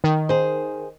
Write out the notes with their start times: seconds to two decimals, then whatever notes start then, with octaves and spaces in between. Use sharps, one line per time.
0.04 D#3
0.29 G#4 C5